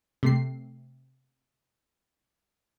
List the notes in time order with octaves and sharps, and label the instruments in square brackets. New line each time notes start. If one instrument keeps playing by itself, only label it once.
[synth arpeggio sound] C3 A3 C7